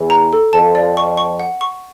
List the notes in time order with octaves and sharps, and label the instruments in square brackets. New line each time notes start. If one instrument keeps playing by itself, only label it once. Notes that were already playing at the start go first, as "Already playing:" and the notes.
Already playing: [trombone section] E2 E3
[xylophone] A#5
A4
[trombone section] F2 F3 [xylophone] A5
[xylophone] D5
C#6
C#6
F#5
C#6